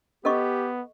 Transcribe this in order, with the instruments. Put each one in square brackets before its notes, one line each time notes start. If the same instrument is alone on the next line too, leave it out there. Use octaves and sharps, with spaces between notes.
[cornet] B3 [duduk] G4 [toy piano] A4 D#5 C#6